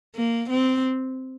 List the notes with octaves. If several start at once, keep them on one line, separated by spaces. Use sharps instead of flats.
A#3
C4